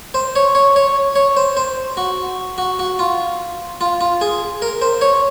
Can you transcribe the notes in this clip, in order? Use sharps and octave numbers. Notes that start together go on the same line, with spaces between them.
C5
C#5
C#5
C#5
C#5
C5
C5
F#4
F#4
F#4
F4
F4
F4
G#4
A#4
C5
C#5